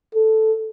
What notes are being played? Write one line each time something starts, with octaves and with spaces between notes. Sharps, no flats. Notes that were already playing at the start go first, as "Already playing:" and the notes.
A4